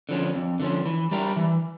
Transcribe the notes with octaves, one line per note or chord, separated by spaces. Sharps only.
D3 F3 C#4
F2
D3 F3 C#4
E3
G3 D4 G4 A#4
E3